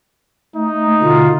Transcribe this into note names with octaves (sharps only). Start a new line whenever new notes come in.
A3 D#4
B2 D3 F4